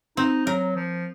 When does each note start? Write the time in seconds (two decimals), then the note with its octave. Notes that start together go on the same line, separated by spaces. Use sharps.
0.17 C4 D#4
0.46 F#3 A#4
0.76 F3